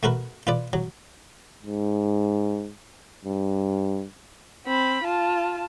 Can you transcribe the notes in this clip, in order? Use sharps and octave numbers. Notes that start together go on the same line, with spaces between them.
A3 F#4 A#4 B4
F4 B4 D5
F#3
G#2
G2
C4 B5
F4 A5